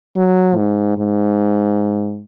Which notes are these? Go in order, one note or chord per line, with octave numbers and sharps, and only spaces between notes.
F#3
G#2
G#2